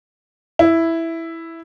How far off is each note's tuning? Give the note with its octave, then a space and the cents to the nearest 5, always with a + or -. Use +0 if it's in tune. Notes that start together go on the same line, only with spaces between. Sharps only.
E4 +0